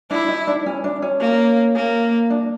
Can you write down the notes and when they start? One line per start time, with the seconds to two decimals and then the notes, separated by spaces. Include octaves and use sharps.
0.11 D4 E4
0.29 D#4
0.47 D4
0.66 C#4
0.84 D4
1.02 C#4
1.21 A#3
1.76 A#3
2.30 D4